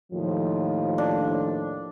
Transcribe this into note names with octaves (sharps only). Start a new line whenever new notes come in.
D#2 A2 F3
D4